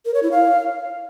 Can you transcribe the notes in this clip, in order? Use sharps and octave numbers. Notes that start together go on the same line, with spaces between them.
A#4
C#5
E4
F5